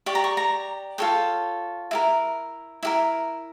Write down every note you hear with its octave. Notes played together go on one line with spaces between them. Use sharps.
G4 D5 C#6
A#5
C#6
A#5
F4 A4 C#5 G5
E4 G4 A#4
E4 G4 A#4